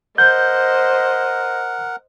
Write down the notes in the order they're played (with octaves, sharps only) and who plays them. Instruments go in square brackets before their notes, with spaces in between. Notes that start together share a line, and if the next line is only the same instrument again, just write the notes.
[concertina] A#4 F#5 [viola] C5 D#5 [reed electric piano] G6